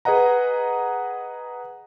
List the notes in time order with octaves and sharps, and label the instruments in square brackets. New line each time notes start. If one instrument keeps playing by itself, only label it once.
[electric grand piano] G#4 B4 D#5 F#5 A#5